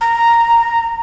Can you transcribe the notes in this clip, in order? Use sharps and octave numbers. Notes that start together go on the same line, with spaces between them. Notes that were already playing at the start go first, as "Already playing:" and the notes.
A#5